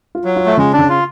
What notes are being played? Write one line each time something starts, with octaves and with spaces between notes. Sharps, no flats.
F4
F#3
F4
A3
C#3 G#3
D4
C#3
F4